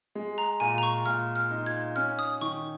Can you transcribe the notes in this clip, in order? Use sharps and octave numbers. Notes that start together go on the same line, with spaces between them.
G#3
A#5
A#2 G#5
A#5
C#6
A#2 F6
F6
D#4
G#6
C#4 F6
D#6
D#3 C#6